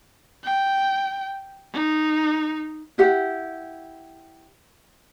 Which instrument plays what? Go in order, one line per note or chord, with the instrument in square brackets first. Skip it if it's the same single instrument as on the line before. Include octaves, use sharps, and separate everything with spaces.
[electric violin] G5
D#4
[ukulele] E4 G4 F#5